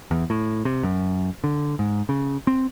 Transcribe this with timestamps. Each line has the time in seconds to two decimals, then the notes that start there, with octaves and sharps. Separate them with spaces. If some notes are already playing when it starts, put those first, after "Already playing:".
0.11 E2
0.30 A2
0.65 C3
0.83 F#2
1.44 D3
1.79 G#2
2.09 C#3
2.47 C4